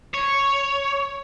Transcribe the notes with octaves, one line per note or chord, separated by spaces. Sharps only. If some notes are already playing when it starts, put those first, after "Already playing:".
C#5